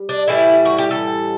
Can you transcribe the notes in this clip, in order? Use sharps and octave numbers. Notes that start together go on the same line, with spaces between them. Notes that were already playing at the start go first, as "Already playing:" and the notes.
Already playing: G3
D4
A2 E3 G3 E4
F#4
G4
A4